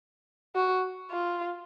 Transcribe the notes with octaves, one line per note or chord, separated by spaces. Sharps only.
F#4
F4